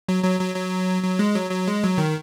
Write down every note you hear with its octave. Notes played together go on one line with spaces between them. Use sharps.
F#3
F#3
F#3
F#3
F#3
G#3
F#3
F#3
G#3
F#3
D#3